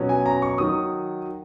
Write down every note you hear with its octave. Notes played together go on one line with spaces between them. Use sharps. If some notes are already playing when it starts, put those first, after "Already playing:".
Already playing: B2 F#3 C#4
G#5
A#5
C#6
D#3 F#3 D#6